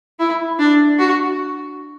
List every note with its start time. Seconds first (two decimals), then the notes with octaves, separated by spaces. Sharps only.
0.19 E4
0.59 D4
0.99 F#4